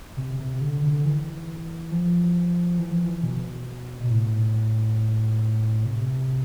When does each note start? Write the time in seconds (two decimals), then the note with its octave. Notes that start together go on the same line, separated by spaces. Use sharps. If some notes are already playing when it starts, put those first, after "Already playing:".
0.17 C3
0.39 C3
0.61 D3
0.83 D3
1.05 E3
1.91 F3
2.79 E3
2.91 F3
3.04 E3
3.23 B2
4.03 B2
4.10 A2
5.85 C3